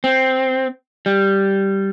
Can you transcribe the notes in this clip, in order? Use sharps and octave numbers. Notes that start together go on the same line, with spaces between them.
C4
G3